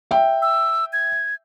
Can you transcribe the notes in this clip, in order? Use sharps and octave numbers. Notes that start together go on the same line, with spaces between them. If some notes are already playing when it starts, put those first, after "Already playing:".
E5 G5
E6
G#6